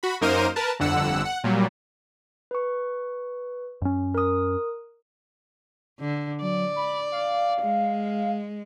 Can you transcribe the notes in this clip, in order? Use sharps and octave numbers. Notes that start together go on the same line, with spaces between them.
F#4 B5
F#2 A#3 D#4 A#4 C5 D#7
A#4 B4 A5
G1 F2 D3 F#5 E6
F#5
A#2 F#3 G3
B4 C#6
F#2 C#4
A#4 D#6
D3
F#3 D5
B5
F5
G#3